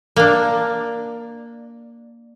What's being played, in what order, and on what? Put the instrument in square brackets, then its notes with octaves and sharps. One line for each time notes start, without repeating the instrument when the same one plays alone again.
[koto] A#3 D4